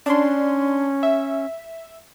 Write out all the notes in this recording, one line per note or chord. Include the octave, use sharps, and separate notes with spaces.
C#4 D4 C6
E5